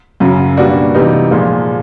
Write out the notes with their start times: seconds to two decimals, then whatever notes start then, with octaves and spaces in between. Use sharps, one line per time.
0.20 F#2 C#3 F#3
0.57 B2 G3 A#3 D4 F#4
0.94 C3 E3 G3 B3 D#4
1.31 A#2 F3 G#3